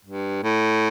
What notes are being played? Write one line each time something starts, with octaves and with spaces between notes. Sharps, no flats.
G2
A2